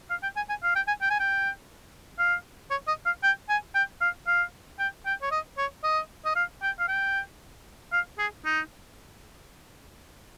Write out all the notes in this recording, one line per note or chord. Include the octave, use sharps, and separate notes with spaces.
F5
G5
G#5
G#5
F5
G5
G#5
G5
G#5
G5
F5
C#5
D#5
F5
G5
G#5
G5
F5
F5
G5
G5
C#5
D#5
C#5
D#5
D#5
F5
G5
F5
G5
F5
G#4
D#4